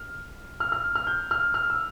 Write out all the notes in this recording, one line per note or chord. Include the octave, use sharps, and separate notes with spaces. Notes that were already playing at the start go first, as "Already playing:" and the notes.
Already playing: F6
F6
F6
F6
G6
F6
F6
E6